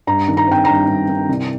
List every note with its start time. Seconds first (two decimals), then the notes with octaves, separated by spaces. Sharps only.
0.07 G2 A#5
0.28 D#3
0.37 A#5
0.48 C4 G5
0.65 G2 A#5
0.88 G2
1.09 D#3
1.29 C2